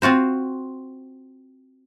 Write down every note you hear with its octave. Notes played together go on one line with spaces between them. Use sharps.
C4 F4 F#4 C5